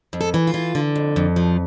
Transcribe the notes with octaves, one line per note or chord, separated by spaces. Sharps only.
F2
A4
E3
F4
E3
D3
F2
F2
F3